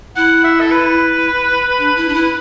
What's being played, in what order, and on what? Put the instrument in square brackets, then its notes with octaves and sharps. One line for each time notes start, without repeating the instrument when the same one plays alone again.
[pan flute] E4 [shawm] F#5
[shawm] E5
A4
B4
[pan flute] D4
E4
D4
E4